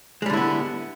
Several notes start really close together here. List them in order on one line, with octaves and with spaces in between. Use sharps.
G#3 G3 D3 E4 B3